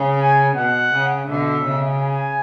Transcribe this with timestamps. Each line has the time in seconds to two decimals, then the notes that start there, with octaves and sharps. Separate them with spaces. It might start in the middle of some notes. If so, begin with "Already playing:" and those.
Already playing: C#3
0.20 G#5
0.56 B2 F#5
0.93 C#3
1.28 B2 D3 E5
1.65 C#3
2.01 G#5